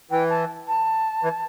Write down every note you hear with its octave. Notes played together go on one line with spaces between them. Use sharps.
E3 G5
A5
A5
E3